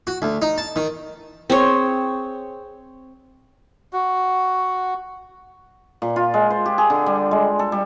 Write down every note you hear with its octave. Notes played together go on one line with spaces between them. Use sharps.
F#4
D2
D#4
A5
D#3
C4 G#4 C#5
F#4
A#2
F4
G#3
C5
G4
G#4
D3
G3
G#3
A4
G3